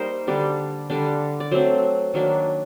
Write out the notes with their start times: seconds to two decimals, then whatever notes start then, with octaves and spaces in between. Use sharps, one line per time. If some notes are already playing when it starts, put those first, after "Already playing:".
Already playing: G3 A#3 D#4 A#4 C5
0.27 D3 G3 D4
0.90 D3 G3 D4
1.40 D5
1.51 F#3 A3 C4 C5
2.14 D#3 F#3 A#3 D4